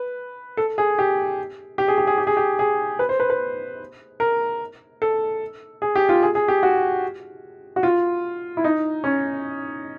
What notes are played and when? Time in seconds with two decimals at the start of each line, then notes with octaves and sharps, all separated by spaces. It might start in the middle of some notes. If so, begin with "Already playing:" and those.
Already playing: B4
0.57 A4
0.78 G#4
0.99 G4
1.78 G4
1.88 G#4
1.98 G4
2.07 G#4
2.18 G4
2.27 G#4
2.37 G4
2.59 G#4
2.99 B4
3.09 C5
3.20 B4
3.30 B4
4.20 A#4
5.02 A4
5.82 G#4
5.95 G4
6.09 F4
6.23 G#4
6.35 G#4
6.48 G4
6.63 F#4
7.76 F#4
7.83 F4
8.57 E4
8.64 D#4
9.04 C#4